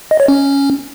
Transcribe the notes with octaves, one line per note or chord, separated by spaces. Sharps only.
D#5
C#5
C#4